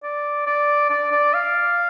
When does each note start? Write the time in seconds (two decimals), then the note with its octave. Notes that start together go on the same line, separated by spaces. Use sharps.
0.03 D5
0.47 D5
0.90 D5
1.11 D5
1.34 F5